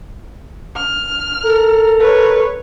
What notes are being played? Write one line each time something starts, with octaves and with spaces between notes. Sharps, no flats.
F6
A4 A#4 A#5
B4 C#5